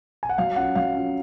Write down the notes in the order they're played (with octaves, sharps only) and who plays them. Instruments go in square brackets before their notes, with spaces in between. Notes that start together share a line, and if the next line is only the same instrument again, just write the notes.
[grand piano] G#5
F#5
F#3 F5
C#4 F4 F#5
F#3 F5
C#4 F4